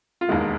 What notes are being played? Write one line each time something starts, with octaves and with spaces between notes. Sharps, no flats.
F4
E1 D#2 D#3 G#3 B3 E4